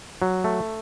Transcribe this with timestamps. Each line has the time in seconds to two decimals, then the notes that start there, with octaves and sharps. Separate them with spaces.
0.22 F#3
0.44 A3